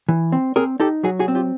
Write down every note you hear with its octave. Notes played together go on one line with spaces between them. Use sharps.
E3
C4
C4 G#4 A#4
D#4 G4 A4
F#3 F#4 G#4
F#4 G#4
C4
F4 G4